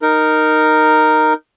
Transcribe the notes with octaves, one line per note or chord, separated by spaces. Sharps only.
D#4 A#4